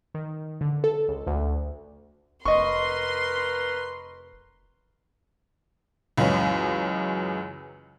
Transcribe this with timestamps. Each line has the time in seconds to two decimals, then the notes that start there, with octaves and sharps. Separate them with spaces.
0.14 D#3
0.61 D3
0.84 A4
1.08 C#2
1.27 D2
2.45 F1 A#4 B4 D#5 C6 C#6
6.18 C#2 F#2 E3 G#3 C#4